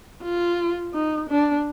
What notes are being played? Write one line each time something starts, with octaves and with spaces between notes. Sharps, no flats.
F4
D#4
D4